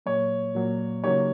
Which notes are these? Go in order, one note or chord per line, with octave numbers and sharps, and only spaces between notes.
A#2 F#3 A#3 C#5
A#2 F#3 A#3
C#3 F#3 A#3 D#4 G4 C#5